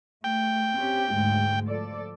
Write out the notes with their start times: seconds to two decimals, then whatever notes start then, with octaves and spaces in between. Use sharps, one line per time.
0.24 A3 G5
0.76 C4 C#4 G4
1.13 D2 G#2 G#3
1.66 F3 A4 D5